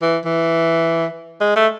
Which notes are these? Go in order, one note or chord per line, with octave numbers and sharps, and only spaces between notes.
E3
E3
G#3
A3